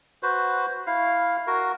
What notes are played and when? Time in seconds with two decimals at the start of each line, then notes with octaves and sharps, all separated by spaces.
0.23 F#4 B4 C5
0.87 E4 F5
1.47 F#4 A#4